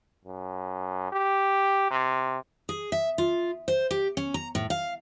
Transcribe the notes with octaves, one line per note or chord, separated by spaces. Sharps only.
F#2
G4
C3
G#4
E5
F4
C5
G4
C#4
A#5
A2
F5